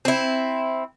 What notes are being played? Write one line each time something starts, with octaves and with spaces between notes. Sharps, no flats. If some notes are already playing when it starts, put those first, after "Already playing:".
C4 E4